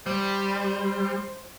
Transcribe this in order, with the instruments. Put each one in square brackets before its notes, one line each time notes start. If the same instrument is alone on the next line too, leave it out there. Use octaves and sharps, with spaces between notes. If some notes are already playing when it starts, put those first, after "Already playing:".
[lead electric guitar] G3 [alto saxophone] C5